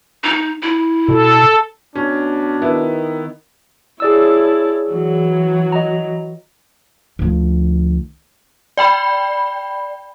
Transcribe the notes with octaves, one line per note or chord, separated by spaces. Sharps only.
D#4
E4
B2 A4
B2 C#4 D4
D#3 B3 E4
E4 G#4 C#5 D5 A5 E6
E3 F#3 F#4
D#5 A#5
D2 F3
D5 G5 B5